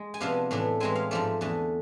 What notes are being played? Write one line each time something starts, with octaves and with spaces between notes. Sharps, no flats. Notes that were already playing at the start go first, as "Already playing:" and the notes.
Already playing: G#3
G#5
C3 F3 B3 D4 F5
A2 E3 A3 D4
A2 E3 G#3 C4 G#5
F5
G#2 F3 A3 D5
E2 D3 A3